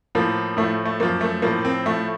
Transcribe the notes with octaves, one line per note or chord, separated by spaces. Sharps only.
A2 F3 A#3
A2 F3 A3
A3
F#2 F3 A#3
A3
A2 F3 A#3
C4
A2 F3 A3